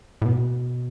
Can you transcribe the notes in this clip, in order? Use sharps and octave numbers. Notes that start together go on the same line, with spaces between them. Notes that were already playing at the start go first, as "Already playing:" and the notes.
A2
B2